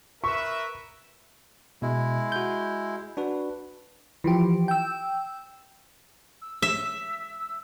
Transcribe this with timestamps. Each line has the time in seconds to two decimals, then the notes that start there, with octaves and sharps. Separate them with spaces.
0.24 A#4 B4 E5 C#6
1.82 B2 G#3 E4
2.32 F#4 G6
3.17 D4 F#4 B4
4.24 E3 F3 G4
4.68 G5 E6
6.41 E6
6.62 E5